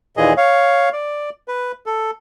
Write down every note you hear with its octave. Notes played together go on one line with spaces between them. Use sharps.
D#2 A#2 E3 G#4 D#5
C#5 F5
D5
B4
A4